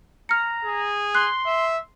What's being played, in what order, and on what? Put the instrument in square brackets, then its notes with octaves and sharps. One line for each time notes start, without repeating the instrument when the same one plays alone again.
[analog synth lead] A#5 [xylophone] F6 C#7
[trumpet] G#4
[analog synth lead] C6 [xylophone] F#6
[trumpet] E5